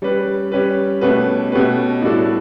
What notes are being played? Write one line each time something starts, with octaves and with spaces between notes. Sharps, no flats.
G3 C#4 G4 B4
G3 C#4 G4 B4
B2 A3 C#4 G4 B4
B2 A3 C#4 G4 B4
A2 G3 D4 F#4 A4